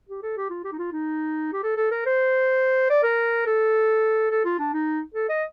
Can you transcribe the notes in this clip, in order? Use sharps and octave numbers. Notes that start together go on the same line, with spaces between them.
G4
A4
G4
F4
G4
D#4
F4
D#4
G4
A4
A4
A#4
C5
D5
A#4
A4
A4
F4
D4
D#4
A4
D#5